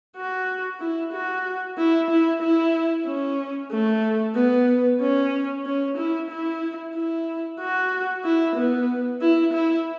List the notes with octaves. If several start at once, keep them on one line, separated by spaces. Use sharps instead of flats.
F#4
E4
F#4
E4
E4
E4
C#4
A3
B3
C#4
C#4
E4
E4
E4
F#4
E4
B3
E4
E4